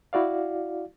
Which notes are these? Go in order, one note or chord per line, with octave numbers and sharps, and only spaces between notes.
E4 F#4 D5 F5